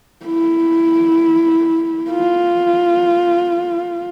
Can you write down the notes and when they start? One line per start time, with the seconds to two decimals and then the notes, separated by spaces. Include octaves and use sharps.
0.26 E4
2.11 F4